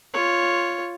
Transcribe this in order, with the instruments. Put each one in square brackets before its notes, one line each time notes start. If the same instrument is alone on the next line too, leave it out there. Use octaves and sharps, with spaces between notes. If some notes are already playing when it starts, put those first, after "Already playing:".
[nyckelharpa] F4 C#5